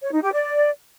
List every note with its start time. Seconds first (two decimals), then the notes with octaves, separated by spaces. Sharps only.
0.02 C#5
0.12 D#4
0.23 G4
0.33 D5